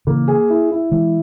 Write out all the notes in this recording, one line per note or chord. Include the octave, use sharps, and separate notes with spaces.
C#3 E3 A#3
G#4
E4
E4
E3 G#3 E4